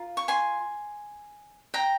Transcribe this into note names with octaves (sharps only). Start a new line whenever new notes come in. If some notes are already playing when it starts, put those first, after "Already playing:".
Already playing: F4 A#4
C#6
G#5 C6
G5 A#5